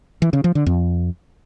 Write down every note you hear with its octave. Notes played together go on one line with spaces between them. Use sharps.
E3
C#3
F3
D3
F2